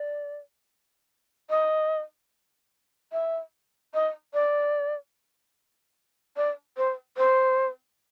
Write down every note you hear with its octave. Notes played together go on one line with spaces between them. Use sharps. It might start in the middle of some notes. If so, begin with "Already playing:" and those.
Already playing: D5
D#5
E5
D#5
D5
D5
C5
C5